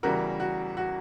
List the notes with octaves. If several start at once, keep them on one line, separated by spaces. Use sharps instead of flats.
E2 C#3 E3 G3 F#4 A#4
F#4
F#4